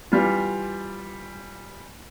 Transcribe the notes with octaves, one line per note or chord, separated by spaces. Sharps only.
E3 G3 F4